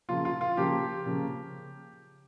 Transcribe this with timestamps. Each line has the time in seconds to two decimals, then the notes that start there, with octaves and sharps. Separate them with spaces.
0.08 C#3 F3 A#3 F4
0.25 F4
0.41 F4
0.57 C#3 F3 A#3 G4
1.06 C#3 F3 A#3